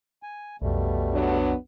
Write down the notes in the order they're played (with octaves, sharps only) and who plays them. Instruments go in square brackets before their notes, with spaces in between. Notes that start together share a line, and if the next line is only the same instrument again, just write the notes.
[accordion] G#5
[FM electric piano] B1 F2 [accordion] B2 G3 A3
[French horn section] F#3 B3 D4